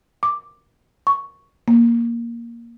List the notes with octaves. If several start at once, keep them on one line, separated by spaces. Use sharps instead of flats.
D6
C#6
A#3